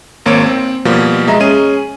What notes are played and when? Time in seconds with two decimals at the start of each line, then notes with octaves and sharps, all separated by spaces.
0.26 G#1 A#3 C4 C#5 D7
0.46 C4
0.85 B2 F3 G3 A#3
1.28 G#3 D#5 E5 A#5
1.40 C#4 G#4 D#7